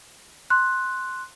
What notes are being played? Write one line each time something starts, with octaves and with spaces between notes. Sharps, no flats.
C6 F#6